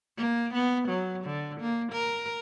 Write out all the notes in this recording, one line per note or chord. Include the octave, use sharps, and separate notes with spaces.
A#3
B3
F#3
D3
A#3
A#4